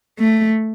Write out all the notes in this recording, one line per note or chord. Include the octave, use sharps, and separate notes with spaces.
A3